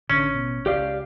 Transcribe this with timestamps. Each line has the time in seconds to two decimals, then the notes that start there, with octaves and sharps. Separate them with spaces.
0.10 A1 D3 C#4
0.35 B2
0.66 C#2 G4 D5 F5